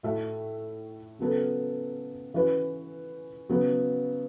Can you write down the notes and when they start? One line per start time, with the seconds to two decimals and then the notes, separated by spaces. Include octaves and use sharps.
0.03 A2 A3 F#4 A4 E5
1.19 C#3 F#3 B3 A4
2.34 E3 C#4 F#4 B4
3.49 C#3 F#3 B3